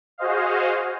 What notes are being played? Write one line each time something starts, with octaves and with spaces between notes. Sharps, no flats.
F#4 G#4 C5 D#5 F5